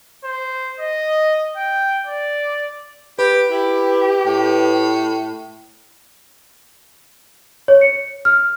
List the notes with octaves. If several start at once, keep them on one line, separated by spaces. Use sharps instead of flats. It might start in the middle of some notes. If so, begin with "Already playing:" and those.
C5
D#5
G5
D5
G4 B4
E4 G4
A2
C#5
C#7
F6